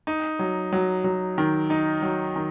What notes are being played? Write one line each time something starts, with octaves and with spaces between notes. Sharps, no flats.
D#4
F#3
F#3
F#3
D#3
D#4
F#3
D#3